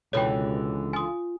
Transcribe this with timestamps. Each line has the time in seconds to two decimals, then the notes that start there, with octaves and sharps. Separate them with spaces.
0.13 C#2 B2 D3 E3 C#5 G5
0.93 F4 G#5 D#6